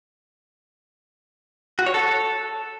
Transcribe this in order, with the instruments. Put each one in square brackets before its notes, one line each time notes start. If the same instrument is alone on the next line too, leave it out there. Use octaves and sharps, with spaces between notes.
[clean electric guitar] F#4
C#5
A4